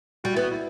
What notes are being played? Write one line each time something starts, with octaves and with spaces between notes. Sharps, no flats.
G3 F#4
B3 E4
F#4
E4